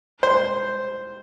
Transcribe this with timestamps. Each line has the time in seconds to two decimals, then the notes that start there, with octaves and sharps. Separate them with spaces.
0.23 C5